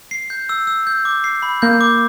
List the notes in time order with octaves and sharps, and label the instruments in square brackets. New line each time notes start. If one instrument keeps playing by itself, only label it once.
[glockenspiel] C7
G6
E6
E6
G6
D6
C7
B5
[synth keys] A#3 [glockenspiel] G6
[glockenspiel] D6